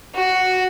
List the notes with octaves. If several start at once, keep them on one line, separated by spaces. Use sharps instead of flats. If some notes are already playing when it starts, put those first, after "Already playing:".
F#4